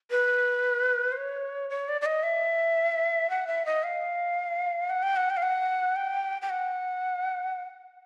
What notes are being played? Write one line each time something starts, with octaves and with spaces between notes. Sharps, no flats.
B4
C5
C#5
C#5
D5
D5
D#5
E5
F#5
E5
D#5
F5
F#5
G5
F#5
G5
F5
F#5
G5
G5
F#5